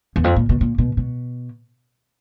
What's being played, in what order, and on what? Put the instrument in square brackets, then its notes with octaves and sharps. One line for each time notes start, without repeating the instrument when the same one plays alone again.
[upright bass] E2
F2
A#2
B2
A#2
B2
B2